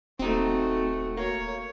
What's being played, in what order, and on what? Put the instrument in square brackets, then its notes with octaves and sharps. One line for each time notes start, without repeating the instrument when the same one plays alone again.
[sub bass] D#1 [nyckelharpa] A3 F#4 [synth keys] C4 D#4
[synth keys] A#3 [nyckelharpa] C#5